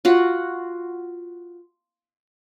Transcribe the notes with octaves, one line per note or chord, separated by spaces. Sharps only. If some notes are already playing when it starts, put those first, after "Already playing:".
F4 F#4 F#5